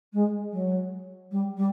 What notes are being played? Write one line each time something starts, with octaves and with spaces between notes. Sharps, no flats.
G#3
F#3
G3
G3